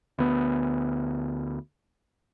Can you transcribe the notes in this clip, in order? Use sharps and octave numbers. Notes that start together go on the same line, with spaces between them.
D2 B3